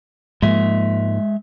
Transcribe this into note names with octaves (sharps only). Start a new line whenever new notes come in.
G#2 F3 G#3 A#3 E5